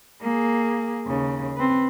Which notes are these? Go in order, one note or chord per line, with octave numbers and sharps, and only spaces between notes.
A#3 G#4
D#2 C#3
C4 B4